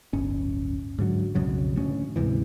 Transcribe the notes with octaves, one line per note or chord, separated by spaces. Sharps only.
D1 G1 C#4
G#2 D3 F#3
B1 F2 C#3 F#3
D2 A2 C#4
D2 G#2 C3 E3